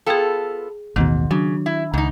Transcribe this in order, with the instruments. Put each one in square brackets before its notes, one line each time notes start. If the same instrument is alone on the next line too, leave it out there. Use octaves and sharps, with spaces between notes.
[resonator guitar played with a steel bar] B3 F4 A4 [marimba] G#4 G5
[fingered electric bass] A1 D#2 B2 [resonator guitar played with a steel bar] G#2 [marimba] D#3
[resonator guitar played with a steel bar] C#3 [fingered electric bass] F#3 [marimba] D4
[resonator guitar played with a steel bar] E4
[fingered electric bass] C#2 [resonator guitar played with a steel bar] G#2 D#4